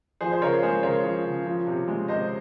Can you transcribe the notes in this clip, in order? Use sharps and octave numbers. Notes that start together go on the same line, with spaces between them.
F3 G#4 C5
C5
C#3 A#4 C#5
G#3 G#4 C5
C#3 A#4 C#5
F3
C#3
F3
C3
G#3
C3 C5 D#5